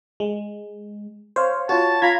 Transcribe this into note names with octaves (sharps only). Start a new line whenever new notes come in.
G#3
C5 C#5 F5
F4 F#4 C#5 A5
F4 A#5 B5 G#6